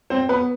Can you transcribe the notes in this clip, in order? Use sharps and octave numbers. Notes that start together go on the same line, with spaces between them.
C4 C5
B3 B4